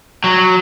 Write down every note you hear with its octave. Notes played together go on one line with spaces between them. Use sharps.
F#3